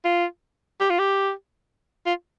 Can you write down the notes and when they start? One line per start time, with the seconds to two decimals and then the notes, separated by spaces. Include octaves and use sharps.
0.05 F4
0.80 G4
0.90 F4
0.99 G4
2.06 F4